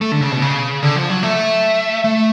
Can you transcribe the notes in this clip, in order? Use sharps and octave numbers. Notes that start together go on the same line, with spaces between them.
A3
D3
C#3
B2
C#3
D3
F3
F#3
A3
A3